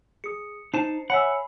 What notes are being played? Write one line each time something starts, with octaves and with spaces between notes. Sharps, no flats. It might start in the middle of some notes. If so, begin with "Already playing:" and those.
G#4 D#6 C#7
D#4 C5 A5 C7
C#5 E5 F#5 G#5 B5 E6